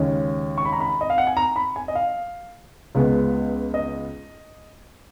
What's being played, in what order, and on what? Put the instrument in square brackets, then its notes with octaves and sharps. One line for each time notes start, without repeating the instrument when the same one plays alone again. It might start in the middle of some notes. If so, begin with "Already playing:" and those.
Already playing: [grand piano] D#2 C#3 G#3 C#4
C#6
B5
A#5
B5
D#5
F5
F#5
G#5
A#5
B5
G#5
D#5
F5
C#2 C#3 G#3 B3
D#5